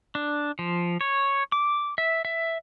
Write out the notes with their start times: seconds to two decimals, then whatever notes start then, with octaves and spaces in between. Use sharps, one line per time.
0.15 D4
0.59 F3
1.01 C#5
1.52 D6
1.98 E5
2.25 E5